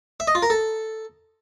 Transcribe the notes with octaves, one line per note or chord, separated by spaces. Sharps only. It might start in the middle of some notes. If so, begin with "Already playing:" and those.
E5
D#5
F4
A#4
A4